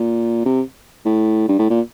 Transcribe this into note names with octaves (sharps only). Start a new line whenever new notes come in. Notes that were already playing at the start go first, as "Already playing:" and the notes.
Already playing: A#2
C3
A2
G2
A2
A#2